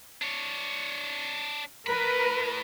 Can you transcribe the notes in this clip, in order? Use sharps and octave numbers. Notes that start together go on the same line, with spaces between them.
D4 C#5
A2 A#4 B4 B5